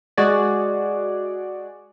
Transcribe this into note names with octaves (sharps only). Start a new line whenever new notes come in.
G#3 F#4 G#4 D5